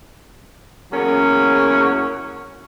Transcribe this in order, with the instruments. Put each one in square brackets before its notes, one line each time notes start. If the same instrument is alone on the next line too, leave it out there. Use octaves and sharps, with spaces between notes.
[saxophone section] E2 F#3 A#3 C#4 F#4 G#4